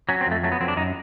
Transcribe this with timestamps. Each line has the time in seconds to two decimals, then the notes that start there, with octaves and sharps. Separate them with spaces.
0.09 F#3 C#4
0.21 C4
0.27 F2 A3
0.43 F#3 A3
0.52 B3
0.61 F2 C4
0.68 D4
0.77 F#2 D#4